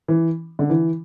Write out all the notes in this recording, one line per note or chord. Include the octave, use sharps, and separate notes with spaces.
E3
D3
E3